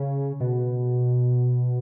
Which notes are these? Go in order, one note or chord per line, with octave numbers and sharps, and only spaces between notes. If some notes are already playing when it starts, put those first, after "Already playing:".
Already playing: C#3
B2